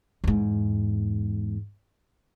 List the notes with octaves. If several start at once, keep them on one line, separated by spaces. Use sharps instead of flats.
E2 G#2